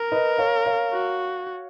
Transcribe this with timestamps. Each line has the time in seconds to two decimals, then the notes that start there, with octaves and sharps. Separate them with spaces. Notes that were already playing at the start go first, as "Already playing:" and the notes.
Already playing: A#4
0.12 B4 D#5
0.38 C#5 F5
0.66 C#5 F5
0.93 F#4